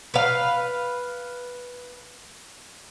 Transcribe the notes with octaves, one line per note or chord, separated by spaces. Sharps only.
B4 F5